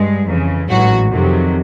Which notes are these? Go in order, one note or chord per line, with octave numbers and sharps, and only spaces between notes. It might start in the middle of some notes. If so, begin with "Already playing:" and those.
Already playing: G2 G#3
F2 C#3 E3
A1 G#2 E3 F#3 F#4
F2 C3 D#3 F#3